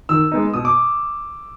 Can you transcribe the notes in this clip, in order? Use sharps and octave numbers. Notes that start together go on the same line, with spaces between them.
D#3 E6
G#3 B3 D#4
B2 D#6
D6